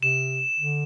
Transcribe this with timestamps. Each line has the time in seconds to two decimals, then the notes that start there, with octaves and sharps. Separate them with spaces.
0.02 C3 E7
0.59 D3